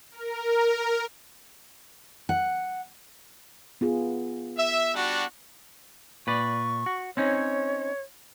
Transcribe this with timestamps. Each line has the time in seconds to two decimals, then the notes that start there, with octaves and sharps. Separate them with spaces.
0.11 A#4
2.29 F#5
3.81 B3 F4 G#4
4.57 E5
4.95 G3 D4 F#4
6.27 A#2 B4 D5 C#6
6.86 F#4
7.17 C4 C#4 D#4 C#5